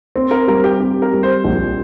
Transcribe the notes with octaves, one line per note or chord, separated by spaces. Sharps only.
C4
A#4
G3 A#4
G4
C4 G4
A#4
G3
C5
A#1